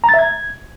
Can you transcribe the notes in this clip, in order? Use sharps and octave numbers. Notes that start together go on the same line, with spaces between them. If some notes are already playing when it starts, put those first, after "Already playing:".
A#5
A6
E5
G#6